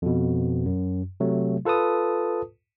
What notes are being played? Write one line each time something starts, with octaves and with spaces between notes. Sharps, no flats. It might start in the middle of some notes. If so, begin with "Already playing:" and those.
F2 B2
F#2
C3 F#3 A3
F4 A4 B4 A5 D#6